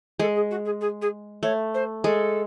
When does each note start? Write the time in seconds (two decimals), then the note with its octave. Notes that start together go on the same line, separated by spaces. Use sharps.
0.20 G#3 A4
0.35 G#4
0.50 F#4
0.65 G#4
0.80 G#4
1.01 G#4
1.43 A3 C#5
1.74 C5
2.04 G#3 A4